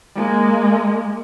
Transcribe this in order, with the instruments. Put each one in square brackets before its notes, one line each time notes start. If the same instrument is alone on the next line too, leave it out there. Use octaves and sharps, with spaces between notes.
[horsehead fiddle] G#3 A#3